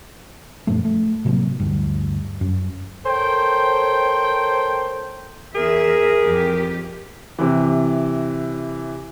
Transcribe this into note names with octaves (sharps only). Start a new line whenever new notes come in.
F#2 A#2 F3 A3
A3
A2 C3 F#3 A#3
D2 G2
F#2
A4 A#4 C5 C#5 G5
E2 G#4 A#4 E5
F2 G4
C3 E3